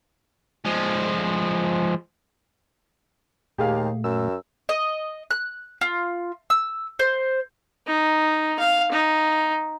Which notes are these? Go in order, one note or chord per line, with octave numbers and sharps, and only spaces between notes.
F3 G#3
D#2 A#2 A3 G4 G#4 F5
F#2 E6
D#5
F#6
F4
E6
C5
D#4
F5
D#4